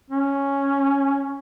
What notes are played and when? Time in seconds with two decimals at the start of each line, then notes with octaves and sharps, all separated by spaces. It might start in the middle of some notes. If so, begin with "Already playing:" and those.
0.10 C#4